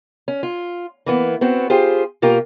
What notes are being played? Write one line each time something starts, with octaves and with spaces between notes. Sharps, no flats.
C#4
F4
E3 A#3 B3
B3 C4 F#4
F4 G4 G#4 C5
B2 A#3 F4 G4 A#4